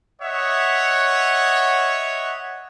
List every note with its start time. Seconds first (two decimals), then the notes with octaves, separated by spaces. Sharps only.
0.22 C#5 D#5 E5 F#5